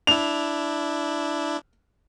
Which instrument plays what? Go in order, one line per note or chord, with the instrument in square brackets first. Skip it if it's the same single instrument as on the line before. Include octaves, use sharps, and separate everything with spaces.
[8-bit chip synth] D4 E4 [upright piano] F7